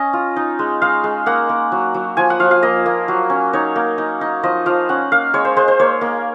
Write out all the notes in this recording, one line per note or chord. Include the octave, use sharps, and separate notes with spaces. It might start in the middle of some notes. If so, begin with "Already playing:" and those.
Already playing: C#4 D#5
F4
D#4
G#3
G#3 F5
G#3
A#3 F#5
A#3
F#3
F#3
F3 G#5
F#5
F3 F5
F5
A#3 D#5
A#3
F#3
C#4
D#4 C#5
A#3
D#4
D#4
F3 D#5
F3 F5
C#4 F#5
A#3 F5
G#3 C#5
C5
G#3 C5
C5
A#3 C#5
A#3